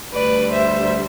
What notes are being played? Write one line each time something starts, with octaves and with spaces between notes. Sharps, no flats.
D2 D3 G3 B4 D5
C5 E5